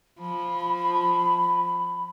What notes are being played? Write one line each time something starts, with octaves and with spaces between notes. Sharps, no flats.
F3 B5